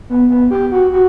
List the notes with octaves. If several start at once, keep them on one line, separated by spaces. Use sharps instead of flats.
B3
B3
G4
F#4
F#4